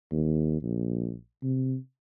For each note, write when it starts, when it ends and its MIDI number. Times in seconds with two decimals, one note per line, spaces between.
0.12 0.58 39
0.62 1.14 34
1.43 1.76 48